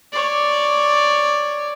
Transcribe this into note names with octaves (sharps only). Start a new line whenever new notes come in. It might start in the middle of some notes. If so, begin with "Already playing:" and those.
C#5 D5